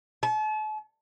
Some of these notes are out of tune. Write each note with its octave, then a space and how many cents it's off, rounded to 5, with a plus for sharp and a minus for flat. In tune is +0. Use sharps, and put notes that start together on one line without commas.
A5 -40